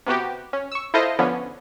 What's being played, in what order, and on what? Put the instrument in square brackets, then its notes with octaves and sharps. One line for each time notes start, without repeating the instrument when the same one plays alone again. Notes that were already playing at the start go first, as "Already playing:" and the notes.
[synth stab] C3 B3 F#4 G4
C#4
C#6 E6
E4 F4 A4 C5 D#5 E5
D3 F3 B3 C#4 D4